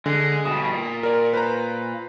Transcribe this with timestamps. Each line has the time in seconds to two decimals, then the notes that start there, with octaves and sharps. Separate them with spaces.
0.06 D3 G#3
0.46 B2 G3 D#6
0.73 A#2
1.03 A#4 D5
1.33 B4 C5 A#5